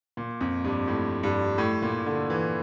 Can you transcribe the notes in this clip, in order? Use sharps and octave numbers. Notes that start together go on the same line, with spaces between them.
A#2
F2
G2
A2
G2
A2
A#2
D3
E3